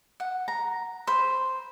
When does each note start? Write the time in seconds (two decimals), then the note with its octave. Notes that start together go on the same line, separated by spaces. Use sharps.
0.20 F#5
0.48 A#5
1.07 C5 B5